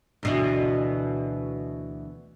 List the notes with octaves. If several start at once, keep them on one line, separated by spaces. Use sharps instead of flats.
D2 B2 E3